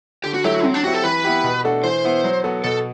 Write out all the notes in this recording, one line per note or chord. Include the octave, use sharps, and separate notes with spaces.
D3 G4
F#4
F#3 A3 E4 G4
F#4
F#3 C4
D4
C4 E4 F#4 G4
A4
E3 B4
B3 E4 G4
B2
A3 D4 F#4 A4
E3 C5
B3 E4
F#3
B3 F#4 A4
B2 A4